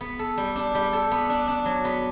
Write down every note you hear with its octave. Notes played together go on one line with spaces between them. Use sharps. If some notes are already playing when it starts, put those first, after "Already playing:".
B3
A4
G3
D4
G3
A4
B3
D4
D4
F#3
B3